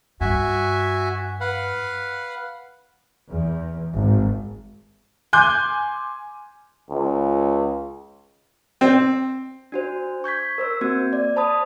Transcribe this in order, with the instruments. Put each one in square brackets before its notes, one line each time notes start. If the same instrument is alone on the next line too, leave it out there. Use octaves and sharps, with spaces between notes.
[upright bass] G2 [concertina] F#4 E5 G#5
[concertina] B4 F5 F#5
[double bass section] E2
G#1
[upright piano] G#5 C6 D6 F#6 G6
[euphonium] C#2
[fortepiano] C4
[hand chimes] D4 F#4 C5
C#6 G6 G#6 B6
A#4 C5 E6
A#3 C4 F#4 G#6
D5
C5 A5 B5 D#6